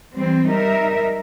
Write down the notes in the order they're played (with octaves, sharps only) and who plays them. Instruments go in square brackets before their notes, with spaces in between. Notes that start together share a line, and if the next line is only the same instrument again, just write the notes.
[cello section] E3 G3 C4
G3 D#4 A#4 E5